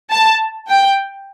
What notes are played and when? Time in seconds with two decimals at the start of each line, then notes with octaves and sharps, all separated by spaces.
0.11 A5
0.69 G5